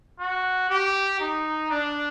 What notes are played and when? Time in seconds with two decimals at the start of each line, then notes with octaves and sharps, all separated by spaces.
0.20 F#4
0.70 G4
1.20 D#4
1.71 D4